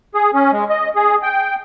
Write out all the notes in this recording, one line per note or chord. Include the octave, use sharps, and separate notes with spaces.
G#4
C#4
G#3
D#5
G#4
G5